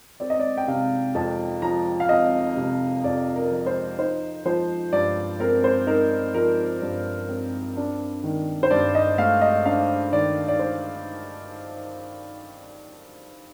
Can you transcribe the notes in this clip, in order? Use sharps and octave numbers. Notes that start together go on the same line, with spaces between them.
C4 D5
D#5
D5
G5
C3 F5
F2 A5
F3 A#5
F5
C4 D#5
C3
F2 D5
A#4
F3
C5
D#4 C5
F3 C5
G2 D5
C4 A#4
C5
D#4 A#4
F3 A#4
G2
C4
D4
D#3
C5
G2 D5
D#5
A3 F5
D#5
D4 F5
D#3 D5
D5
C5